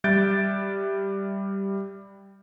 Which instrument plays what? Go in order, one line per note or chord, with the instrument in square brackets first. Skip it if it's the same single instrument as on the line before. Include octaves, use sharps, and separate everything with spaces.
[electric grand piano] G3 E5 F#6 G6 A6 D7